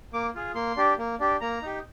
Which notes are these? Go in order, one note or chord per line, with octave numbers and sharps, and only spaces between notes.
A#3 D6
F4 G#4
A#3 C6
D4 G4
A#3
D4 G4
A#3 A#5
D#4 G4